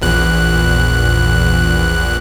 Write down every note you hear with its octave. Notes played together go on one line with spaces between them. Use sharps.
A#1 E2 F#6